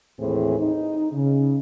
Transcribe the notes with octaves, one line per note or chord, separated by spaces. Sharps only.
D#2 A2 E3 C4 G#4
D#4
C#3